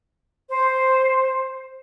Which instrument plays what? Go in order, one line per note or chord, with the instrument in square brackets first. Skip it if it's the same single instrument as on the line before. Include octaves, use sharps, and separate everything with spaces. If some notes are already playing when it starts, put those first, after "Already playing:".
[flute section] C5